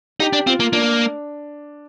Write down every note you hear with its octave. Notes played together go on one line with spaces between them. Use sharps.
D#4 G4
D4
C4 F4
A#3
A#3 D4